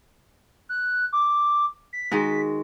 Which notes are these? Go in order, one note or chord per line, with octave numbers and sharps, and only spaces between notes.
F#6
D6
B6
D#3 G#3 F#4